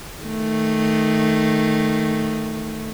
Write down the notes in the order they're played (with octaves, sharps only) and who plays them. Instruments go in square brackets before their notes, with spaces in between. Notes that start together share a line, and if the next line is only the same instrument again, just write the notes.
[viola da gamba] D#3 A3